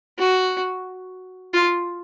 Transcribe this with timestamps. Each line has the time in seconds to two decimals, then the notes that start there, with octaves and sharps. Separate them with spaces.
0.18 F#4
1.53 F4